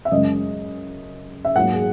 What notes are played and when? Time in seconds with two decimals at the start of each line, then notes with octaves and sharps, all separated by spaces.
0.05 E5
0.12 F#2 C#3 G#3 D#5
1.45 E5
1.56 G#2 F#3 A#3 F#5
1.74 G#4